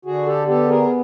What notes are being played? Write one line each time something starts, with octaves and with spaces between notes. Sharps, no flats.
D3 F#4 G#4
G4 A4
B3 G4 A4
G#4 A#4